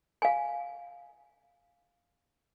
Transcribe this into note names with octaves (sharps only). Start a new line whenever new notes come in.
F5 G#5